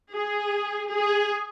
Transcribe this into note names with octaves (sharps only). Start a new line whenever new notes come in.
G#4
G#4